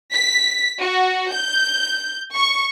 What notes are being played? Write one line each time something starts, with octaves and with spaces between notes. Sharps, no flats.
B6
F#4
G6
C#6